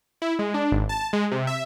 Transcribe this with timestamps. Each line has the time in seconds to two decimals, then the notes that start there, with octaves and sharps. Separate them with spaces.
0.22 E4
0.39 G#3
0.54 D4
0.72 G#1
0.89 A5
1.13 G#3
1.32 C3
1.47 E5